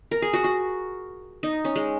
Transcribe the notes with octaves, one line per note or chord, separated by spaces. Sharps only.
A#4
G#4
F#4
F#4
D#4
C#4
G#3